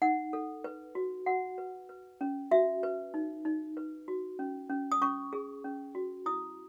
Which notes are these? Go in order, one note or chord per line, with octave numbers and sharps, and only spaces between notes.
D#4 F#5
A4
B4
F#4
F#4 F#5
B4
B4
C#4
F#4 E5
B4
D#4
D#4
B4
F#4
C#4
C#4
D#6
C#4 C#6
G#4
C#4
F#4
E4 D#6